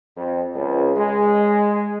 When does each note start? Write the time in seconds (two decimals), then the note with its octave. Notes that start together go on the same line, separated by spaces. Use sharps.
0.17 F2
0.55 C#2
0.95 G#3